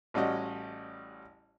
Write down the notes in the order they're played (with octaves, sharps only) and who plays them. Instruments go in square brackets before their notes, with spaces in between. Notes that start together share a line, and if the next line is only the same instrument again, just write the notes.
[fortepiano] A1 G3 C#4 F#4 D#5